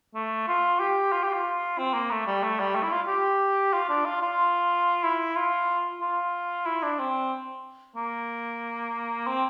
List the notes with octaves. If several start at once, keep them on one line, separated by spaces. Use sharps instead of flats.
A3
F4
G4
F4
G4
F4
C4
A#3
A3
G3
A3
G3
A3
E4
F4
G4
F4
D4
F4
F4
E4
F4
F4
E4
D4
C4
A#3
C4